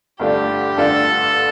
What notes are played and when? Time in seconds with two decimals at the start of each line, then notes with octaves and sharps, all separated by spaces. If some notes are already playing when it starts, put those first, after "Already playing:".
0.20 G2 D3 A3 D4 F4 G4
0.77 G2 D3 A3 D4 F4 A4